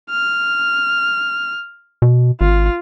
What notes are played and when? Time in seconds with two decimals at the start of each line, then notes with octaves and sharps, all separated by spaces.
0.10 F6
2.02 B2
2.41 G#1 F4